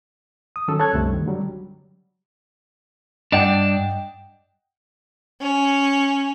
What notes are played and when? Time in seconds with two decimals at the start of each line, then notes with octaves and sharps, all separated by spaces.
0.56 D#6
0.68 D#3 F#3 C#4 A4 E6
0.79 A4 C#5 A5 F#6 G#6
0.93 C2 F#2 D3 G3 A3 C4
1.14 D#3
1.26 D3 F#3 G3
3.32 G2 D4 D#5 F#5 G5
5.42 C#4